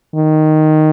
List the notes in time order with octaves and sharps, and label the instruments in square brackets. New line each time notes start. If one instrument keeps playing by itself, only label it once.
[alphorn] D#3